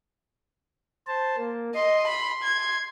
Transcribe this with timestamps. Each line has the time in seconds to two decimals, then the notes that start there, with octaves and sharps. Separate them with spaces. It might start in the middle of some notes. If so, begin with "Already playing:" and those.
1.07 C5 A5
1.37 A#3
1.75 D#5 C6
2.07 B5
2.43 G#6